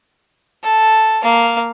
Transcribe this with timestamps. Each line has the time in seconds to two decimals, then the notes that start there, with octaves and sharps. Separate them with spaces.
0.64 A4
1.23 A#3 F5